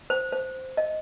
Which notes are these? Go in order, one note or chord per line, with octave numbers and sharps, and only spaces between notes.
C5
C5
D#5